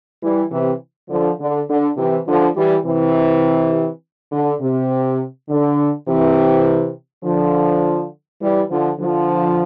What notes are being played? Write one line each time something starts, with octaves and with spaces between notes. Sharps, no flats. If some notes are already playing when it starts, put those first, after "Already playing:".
E3 G3
C3 E3
D3 F3
D3
D3
C3 E3
D3 F3
E3 G3
C3 E3
D3
C3
D3
C3 E3
D3 F3
E3 G3
D3 F3
D3 F3